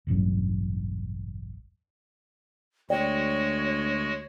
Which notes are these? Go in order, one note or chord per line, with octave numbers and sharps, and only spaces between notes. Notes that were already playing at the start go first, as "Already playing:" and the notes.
E1 A1 G2 F#3
D2 G#3 F#4 C#5 D5 G5